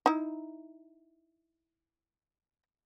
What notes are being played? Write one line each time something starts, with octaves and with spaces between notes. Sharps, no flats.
D#4 E4